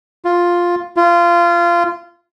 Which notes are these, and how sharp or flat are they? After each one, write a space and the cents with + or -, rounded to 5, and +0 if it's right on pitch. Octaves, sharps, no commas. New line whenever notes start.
F4 +5
F4 -20